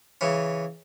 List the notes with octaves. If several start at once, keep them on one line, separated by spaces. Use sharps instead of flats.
C#3 E3 C#4